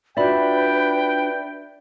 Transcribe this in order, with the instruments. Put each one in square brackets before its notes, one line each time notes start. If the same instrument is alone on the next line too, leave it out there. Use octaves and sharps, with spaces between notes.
[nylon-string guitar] D4 F4 F#4 [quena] B4 [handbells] D5 E5 B5 [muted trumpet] G5